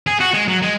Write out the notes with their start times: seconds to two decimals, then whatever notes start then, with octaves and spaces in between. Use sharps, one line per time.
0.07 G#4
0.20 F#4
0.34 G#3
0.48 F#3
0.62 G#3